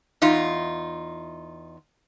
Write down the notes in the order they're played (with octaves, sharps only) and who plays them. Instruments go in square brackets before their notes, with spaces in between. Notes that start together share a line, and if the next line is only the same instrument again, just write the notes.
[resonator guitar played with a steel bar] E2 D#4 F4